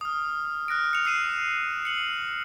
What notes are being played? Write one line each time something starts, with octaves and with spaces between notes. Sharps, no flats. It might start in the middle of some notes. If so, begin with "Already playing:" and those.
D#6 F6
F6 F#6 A#6 D7
C#7 F7
E6 C7 D#7 E7
C#7 F#7